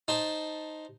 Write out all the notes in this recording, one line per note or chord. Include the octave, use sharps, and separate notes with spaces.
D#4 C5 A5